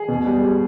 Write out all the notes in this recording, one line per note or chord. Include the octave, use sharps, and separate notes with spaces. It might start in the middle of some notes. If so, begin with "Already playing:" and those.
Already playing: G#4
B2
G3
G3